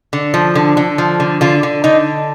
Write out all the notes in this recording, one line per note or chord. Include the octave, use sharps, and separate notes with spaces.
D3
F3
D3
D3
F3
D3
D3 F4
D3
D3 D#4